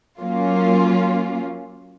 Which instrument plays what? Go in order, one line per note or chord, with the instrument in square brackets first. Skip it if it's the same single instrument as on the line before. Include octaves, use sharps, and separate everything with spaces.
[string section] F#3 A#3 C#4 F4